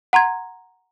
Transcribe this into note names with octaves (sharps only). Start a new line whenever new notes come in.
F#5 A#5 C6 G#6